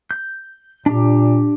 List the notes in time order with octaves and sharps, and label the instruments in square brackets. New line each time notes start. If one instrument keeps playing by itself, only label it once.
[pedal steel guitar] G6
[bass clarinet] A#2 [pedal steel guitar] D4 G4